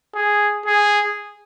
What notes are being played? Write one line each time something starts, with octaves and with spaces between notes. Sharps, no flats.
G#4
G#4